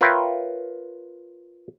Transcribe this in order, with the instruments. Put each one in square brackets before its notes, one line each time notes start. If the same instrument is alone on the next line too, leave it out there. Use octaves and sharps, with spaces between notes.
[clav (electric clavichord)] F4 A#4 B4 C#5 E5 G5